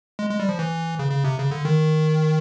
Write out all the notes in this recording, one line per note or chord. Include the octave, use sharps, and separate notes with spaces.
G#3
G#3
G3
F3
E3
C#3
C#3
C3
C#3
D3
D#3